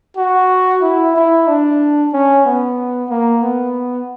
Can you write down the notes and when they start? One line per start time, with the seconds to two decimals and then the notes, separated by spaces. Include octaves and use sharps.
0.17 F#4
0.82 E4
1.15 E4
1.48 D4
2.13 C#4
2.45 B3
3.10 A#3
3.42 B3